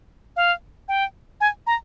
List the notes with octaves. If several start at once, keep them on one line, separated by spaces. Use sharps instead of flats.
F5
G5
G#5
A#5